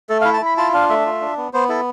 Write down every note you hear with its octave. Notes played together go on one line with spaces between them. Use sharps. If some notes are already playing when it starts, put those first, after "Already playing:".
A3 A4
F5
E4
A5
E4 B5
F4 A5
D4 F5
A3 E5
F4
D4
B3
B3 C5
E4 A4